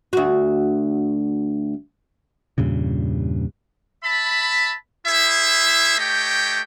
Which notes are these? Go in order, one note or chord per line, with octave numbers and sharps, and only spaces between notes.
D2 F#4
E2 G2 A#2 C#3
E5 A5 B5
E4 G#4 C5 E5
A3 G4 C#5 D#5 G5